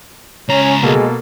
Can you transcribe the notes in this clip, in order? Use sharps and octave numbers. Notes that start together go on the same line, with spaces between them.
C#2 C#4 A#5
B2 G#3 A#3 A4